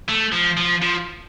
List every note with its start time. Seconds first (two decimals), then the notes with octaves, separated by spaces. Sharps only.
0.09 A3
0.32 F3
0.57 F3
0.82 F3